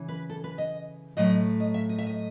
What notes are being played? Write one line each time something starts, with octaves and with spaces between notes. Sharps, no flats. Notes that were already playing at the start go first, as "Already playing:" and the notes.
Already playing: C#3 E3
B4
A4
B4
D#5
A2 F#3 A3 D#5
D#5
E5
D#5
E5
D#5